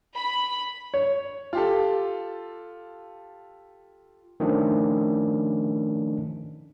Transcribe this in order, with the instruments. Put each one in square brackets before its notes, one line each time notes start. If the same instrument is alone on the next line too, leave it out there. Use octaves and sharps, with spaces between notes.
[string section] B5
[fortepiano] C#5
[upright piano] F4 G4 A4
[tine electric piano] D#3 F3 A3 C#4 D4